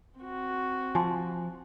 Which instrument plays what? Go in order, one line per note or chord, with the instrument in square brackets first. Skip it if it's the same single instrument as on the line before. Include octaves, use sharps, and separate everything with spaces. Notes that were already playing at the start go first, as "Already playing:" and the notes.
[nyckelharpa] C4 F#4
[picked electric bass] F3 [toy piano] G#5 A5 C6